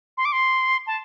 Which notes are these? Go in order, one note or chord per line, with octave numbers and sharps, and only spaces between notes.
C6
D6
C6
A5